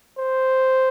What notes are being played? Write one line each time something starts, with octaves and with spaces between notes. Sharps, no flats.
C5